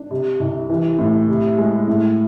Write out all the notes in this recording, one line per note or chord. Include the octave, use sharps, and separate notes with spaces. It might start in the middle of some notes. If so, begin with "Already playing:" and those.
Already playing: D4
C3
C2
E3
A2
C3
G#3
A2